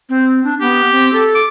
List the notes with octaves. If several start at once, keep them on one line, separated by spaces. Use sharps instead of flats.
C4
D4
B3 G4
C4
A4
D6